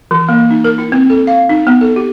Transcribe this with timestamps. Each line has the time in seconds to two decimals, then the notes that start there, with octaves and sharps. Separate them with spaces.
0.11 E3
0.29 A#3
0.50 D#4
0.64 A#4
0.78 E4
0.92 C4
1.10 A4
1.27 F5
1.49 D#4
1.67 B3
1.81 A4
1.96 G4